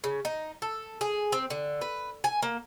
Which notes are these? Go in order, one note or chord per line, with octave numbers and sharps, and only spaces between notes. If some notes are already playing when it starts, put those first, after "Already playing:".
C#3
D#4
A4
G#4
C4
D3
B4
G#5
A#3